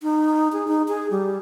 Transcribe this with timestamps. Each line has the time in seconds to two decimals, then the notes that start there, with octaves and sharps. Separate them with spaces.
0.03 D#4
0.53 G#4
0.68 D#4
0.88 G#4
1.11 G3